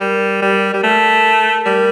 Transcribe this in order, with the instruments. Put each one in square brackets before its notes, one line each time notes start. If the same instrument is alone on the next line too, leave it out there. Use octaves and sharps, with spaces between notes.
[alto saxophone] G3 [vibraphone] A#4
[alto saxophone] G3
G3
A3
[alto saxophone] G3 [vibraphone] A#4